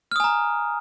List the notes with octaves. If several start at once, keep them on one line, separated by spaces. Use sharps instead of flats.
G#5 A#5 D#6 F6